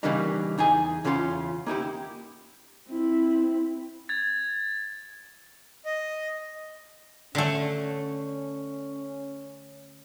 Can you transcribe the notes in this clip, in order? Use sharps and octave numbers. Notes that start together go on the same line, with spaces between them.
C#3 E3 G3 A#3 D4 D#4
E2 D#4 G#4 G#5
E2 C#3 C#4 F4 B5 C6
A#3 D#4 E4 G4
C4 E4
G#6 A6
D#5
D3 A3 C#4